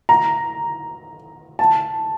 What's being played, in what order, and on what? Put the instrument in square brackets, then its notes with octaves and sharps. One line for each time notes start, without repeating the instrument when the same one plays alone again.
[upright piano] A#5
A5